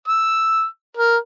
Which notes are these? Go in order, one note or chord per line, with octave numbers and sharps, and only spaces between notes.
E6
A#4